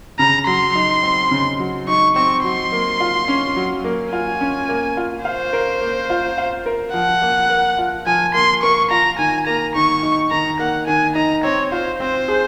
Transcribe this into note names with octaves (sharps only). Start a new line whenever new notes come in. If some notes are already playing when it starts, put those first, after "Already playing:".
C#3 A#5
F#3 C6
D#4
C4
C#3
F#3
D#4 C#6
C4 C#6
F#3 C6
A#3
F4
C#4
F#3
A#3
F4 G#5
C#4
A#3
F4
C5 F5
A#4
A#3
F4
F5
A#4
F3 F#5
A#3
A#4
F4
F3 G#5
A#3 C6
A#4 C#6
F4 A#5
D#3 G#5
A#3 A#5
D#3 C#6
D#4
D#3 A#5
A#3 F#5
D#3 G#5
D#4 A#5
C4 C#5
F4 C5
C4 C5
G#4